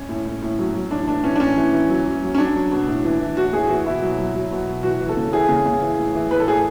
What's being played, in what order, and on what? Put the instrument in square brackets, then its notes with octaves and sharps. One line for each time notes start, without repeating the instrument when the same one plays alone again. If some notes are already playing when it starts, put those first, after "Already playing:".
Already playing: [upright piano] C#4
A2
A2
A2
F#3
F#3
A2 D4
E3 D4
E3 C#4
D4
A2 C#4
E3
E3
F#3
F#3
F#3
C#4
F#3 D4
F#3
B2
A2
E3
E3
A2 F#4
A2 G#4
E3 F#4
B2 E4
F#3
F#3
F#3
B2
F#3
E3 F#4
E3
A4
C#3
E3 G#4
C#3
C#3
E3
A2
E3
A2 B4
A4
A2 G#4